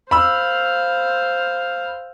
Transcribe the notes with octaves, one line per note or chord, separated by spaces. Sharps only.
C5 F5 B5 E6